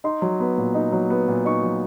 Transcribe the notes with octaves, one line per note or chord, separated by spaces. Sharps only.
D#4 C6
F#3
B3
A#2
D#4
F#3
B3
A#2
D#4 C#6
F#3